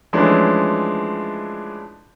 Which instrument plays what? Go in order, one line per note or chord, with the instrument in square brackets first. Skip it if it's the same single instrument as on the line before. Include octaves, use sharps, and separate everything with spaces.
[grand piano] E3 F3 G#3 A3 C#4 D4